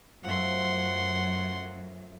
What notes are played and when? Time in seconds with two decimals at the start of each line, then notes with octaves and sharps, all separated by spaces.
0.24 F#2 F3 A3 F#5 C6